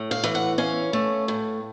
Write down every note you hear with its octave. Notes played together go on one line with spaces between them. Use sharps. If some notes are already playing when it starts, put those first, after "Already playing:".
Already playing: A2
F5
E3
F#5
C#4 F5
A3
A2